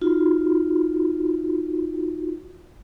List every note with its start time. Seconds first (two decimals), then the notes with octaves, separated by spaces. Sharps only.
0.01 D#4 F4 F#4